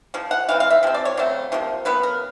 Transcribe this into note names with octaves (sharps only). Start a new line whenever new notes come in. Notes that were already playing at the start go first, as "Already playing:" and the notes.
C#3 F3
F#5
E3 G#3 C4 F5
F5
E5
C3 F3 C4
D5
C#5
C#3 F#3 A3 C4
C3 F3 A#3
C#3 F#3 B3 B4
A#4